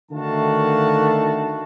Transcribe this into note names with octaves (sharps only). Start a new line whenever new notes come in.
D3 D#3 A3 F#4 F5 A5